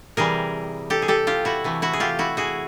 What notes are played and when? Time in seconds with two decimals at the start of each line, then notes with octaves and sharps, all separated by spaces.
0.17 C3 E3 G3 G#4 A#4
0.90 G4 A4
1.02 G#4
1.08 G4 A4
1.27 F4 G4
1.45 E4 F#4
1.64 C3 E3 A3
1.82 E4 F#4
1.93 G#4
2.00 F4 G4
2.19 E4 F#4
2.37 F#4 G#4